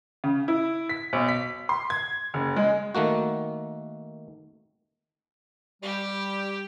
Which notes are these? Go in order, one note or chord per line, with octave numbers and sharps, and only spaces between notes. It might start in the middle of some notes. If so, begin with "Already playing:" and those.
C#3
E4
B6
B1
B6
C6
G#6
F#1
G#3
D#3 A3 A#3 F#4
G3 G4